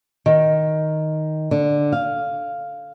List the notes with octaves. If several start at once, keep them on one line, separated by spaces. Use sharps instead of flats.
D#3
D3
F5